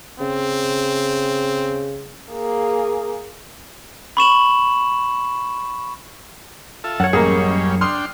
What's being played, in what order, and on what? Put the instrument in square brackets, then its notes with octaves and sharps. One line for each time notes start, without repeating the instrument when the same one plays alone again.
[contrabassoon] C#3 [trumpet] C4
[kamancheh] A#3 G#4
[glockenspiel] B5 C#6 E7 F#7
[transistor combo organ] F4 A4 E5
[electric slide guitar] F#2 C#5 [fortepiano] F#5
[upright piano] A1 A#5 [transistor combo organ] G3 C#4 [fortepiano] A#3 G#4
[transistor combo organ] D4 G5 [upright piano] C6 D#6 F6